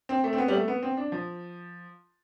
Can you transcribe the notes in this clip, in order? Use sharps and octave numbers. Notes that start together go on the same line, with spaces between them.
C4
A3
C4
B3
G3
A3
B3
C4
D4
F3